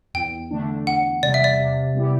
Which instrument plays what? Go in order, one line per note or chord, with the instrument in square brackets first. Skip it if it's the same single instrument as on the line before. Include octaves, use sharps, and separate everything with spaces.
[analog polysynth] E2 [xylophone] G5
[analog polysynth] D3 A3 D4
[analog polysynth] E2 [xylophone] F#5
[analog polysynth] C3 G3 [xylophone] D5
[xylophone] E5
D5
[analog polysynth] C3
G3 B3 E4 G4